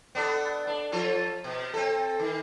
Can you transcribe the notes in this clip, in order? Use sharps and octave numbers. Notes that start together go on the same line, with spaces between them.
B3 D4 A4
D4
F3 F4 A4
B2
C4 A4
D#3